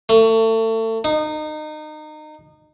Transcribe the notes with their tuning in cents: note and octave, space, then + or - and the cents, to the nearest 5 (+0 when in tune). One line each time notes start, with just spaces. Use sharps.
A3 +30
D#4 -25